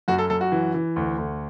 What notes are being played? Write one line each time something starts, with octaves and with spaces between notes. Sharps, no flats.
F#2 F#4
A4
F#2 A4
F#4
E3
E3
D2
D2